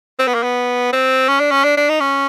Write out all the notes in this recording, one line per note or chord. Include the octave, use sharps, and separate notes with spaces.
C4
B3
A#3
B3
C4
C#4
D4
C#4
D4
D4
D#4
C#4